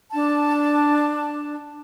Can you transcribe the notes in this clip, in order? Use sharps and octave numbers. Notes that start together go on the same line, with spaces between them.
D4 A5